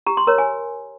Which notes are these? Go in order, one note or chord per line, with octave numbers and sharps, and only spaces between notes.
G4 A#5
C6
A#4 C#5 A#5
G#5